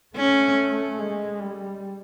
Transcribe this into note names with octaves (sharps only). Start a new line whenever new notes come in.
A3 C#4
G#3
G3